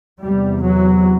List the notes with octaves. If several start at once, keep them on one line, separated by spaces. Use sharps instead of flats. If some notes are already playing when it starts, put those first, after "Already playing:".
E2 C3 G3
F#3